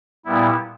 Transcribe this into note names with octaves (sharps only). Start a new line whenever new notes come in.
A#2 G3 B3 E4